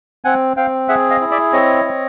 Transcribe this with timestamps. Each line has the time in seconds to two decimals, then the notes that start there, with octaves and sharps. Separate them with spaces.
0.25 C4 F#5 G#5
0.57 C4 F5 G5
0.89 G#4 E5 F#5
1.10 D#5 F5
1.21 E4
1.31 D5 E5
1.53 C4 C#5 D#5
1.85 C4